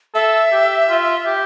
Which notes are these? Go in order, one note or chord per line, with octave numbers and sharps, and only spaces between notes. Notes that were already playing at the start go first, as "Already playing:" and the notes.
A4 E5
G4
F4
G4